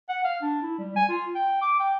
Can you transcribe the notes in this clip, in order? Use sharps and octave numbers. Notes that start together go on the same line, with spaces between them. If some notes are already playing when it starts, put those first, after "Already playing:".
F#5
F5
D4
E4
G3
G#5
F4
G5
D6
G5